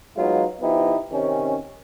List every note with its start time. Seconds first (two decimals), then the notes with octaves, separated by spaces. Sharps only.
0.17 F#3 G#3 B3 D#4 F4
0.61 F3 B3 D#4 E4 G4
1.12 C3 D#3 C#4